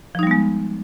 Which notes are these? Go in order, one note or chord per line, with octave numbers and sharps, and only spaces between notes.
F3 G3 G#3 B3 D#4